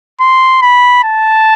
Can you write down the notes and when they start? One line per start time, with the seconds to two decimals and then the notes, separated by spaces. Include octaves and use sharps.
0.21 C6
0.62 B5
1.04 A5